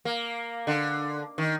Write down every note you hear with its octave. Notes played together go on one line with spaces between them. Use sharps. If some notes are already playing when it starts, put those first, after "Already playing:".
A#3
D3
D#3